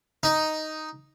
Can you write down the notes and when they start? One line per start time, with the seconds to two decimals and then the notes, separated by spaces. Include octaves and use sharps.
0.23 D#4